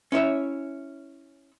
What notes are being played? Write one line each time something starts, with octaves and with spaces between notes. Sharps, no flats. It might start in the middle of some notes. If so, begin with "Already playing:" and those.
C#4 E4 C#5 E5